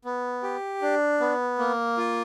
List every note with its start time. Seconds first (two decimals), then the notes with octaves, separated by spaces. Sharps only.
0.05 B3
0.43 G4
0.82 D4
1.20 B3
1.59 A#3
1.97 F4